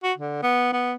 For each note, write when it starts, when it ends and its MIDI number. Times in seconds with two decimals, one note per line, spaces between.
0.04 0.13 66
0.18 0.38 50
0.43 0.70 59
0.73 0.94 59